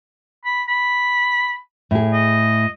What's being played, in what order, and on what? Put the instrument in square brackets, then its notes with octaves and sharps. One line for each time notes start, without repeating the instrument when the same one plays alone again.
[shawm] B5
B5
[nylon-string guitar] A2 G#4
[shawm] D#5